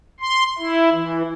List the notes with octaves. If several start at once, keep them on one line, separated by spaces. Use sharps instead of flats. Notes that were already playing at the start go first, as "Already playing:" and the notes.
C6
E4
E3